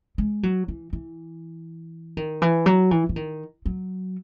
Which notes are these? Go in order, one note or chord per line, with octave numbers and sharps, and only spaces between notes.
G#3
F#3
E3
E3
D#3
E3
F#3
E3
E3
D#3
F#3